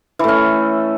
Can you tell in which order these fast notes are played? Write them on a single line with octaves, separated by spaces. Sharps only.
E3 A3 C#4